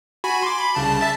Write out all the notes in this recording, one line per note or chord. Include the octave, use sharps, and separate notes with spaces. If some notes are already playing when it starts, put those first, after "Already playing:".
F#4 G#5 B5
C6 D6
B5
C2 C#3 A5
E5 A5 A6